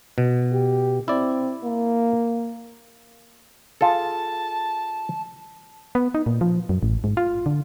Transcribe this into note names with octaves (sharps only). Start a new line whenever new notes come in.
B2
G4
C4 E4 D5
A#3
F4 G#4 A4 A5
B3
D#4
A#2
F3
F#2
A1
G#2
F4
D3